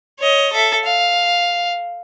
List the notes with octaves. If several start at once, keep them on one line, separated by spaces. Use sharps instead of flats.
C#5 D#5
A4 E5
F5